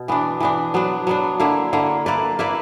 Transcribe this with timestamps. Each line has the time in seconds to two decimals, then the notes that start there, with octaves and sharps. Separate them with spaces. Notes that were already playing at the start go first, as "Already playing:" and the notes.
Already playing: B2
0.08 E3 B3 D4
0.40 E3 B3 D4
0.74 F#3 B3 D4
1.07 F#3 B3 D4
1.40 D3 A#3 E4
1.73 D3 A#3 E4
2.06 A#3 E4 B4 D5
2.39 A#3 E4 B4 D5